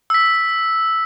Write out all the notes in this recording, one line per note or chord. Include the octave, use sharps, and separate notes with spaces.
E6 B6